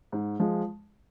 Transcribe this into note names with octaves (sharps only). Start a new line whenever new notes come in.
G#2
F3 G#3